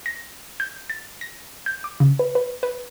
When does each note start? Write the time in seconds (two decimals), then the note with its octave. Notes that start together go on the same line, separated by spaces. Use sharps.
0.06 A#6
0.60 G6
0.90 A6
1.21 A#6
1.66 G6
1.84 D6
2.00 C#3
2.19 B4
2.35 B4
2.63 B4